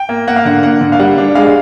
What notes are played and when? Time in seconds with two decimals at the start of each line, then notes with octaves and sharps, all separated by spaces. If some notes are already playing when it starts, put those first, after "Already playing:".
Already playing: G5
0.09 A#3
0.27 A#3 F#5
0.36 F5
0.45 D3 F#5
0.63 A#3 F#5
0.81 D3
0.92 F5
0.99 G3 F#5
1.18 D4
1.35 G#3 F5